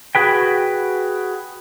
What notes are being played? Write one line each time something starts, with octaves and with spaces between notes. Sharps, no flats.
F#4 G#4 B4 G5